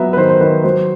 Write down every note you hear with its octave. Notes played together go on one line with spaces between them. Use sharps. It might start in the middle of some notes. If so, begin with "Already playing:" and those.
Already playing: F#3 B3 E5 A#5
B4
D#3 C5
C5
D#3 B4
F#3 C5